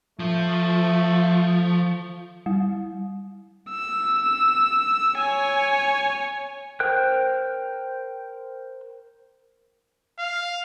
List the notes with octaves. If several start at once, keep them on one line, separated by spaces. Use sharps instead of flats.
F3 A3
G3
E6
C#5 G#5
A#4 C5 G5 F#6
F5